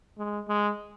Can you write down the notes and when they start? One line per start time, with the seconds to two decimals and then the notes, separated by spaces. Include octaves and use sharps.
0.18 G#3
0.49 G#3